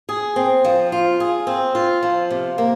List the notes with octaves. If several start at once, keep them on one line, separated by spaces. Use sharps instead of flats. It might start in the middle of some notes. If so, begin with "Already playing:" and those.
G#4
C4
F3
F4
G#4
C4
F4
F3
C3
A#3